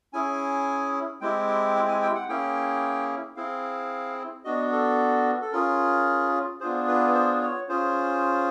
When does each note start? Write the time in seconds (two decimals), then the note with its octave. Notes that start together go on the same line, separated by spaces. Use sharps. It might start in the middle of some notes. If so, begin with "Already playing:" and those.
0.13 C#4 E4 G#4 G#5
1.21 G#3 C4 E4 G4 G5
1.48 G5
1.75 G5
1.88 G#5
2.02 G5
2.15 F#5
2.29 A#3 C#4 E4 G#4 G5
3.36 C4 E4 G#4 F5
4.45 B3 D4 F#4 D#5
4.72 A4
5.41 A4
5.52 C#4 F4 G#4 A#4
6.60 B3 D4 F4 G#4 C5
6.88 B4
7.14 C5
7.42 C#5
7.69 C#4 F4 G#4 C5